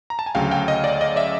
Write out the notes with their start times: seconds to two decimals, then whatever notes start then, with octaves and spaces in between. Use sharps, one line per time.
0.10 A#5
0.19 A5
0.26 G#5
0.35 D2 C#3 F#3 F5 G5
0.51 F5 G5
0.68 D#5
0.84 D5
1.01 D#5
1.16 D5 E5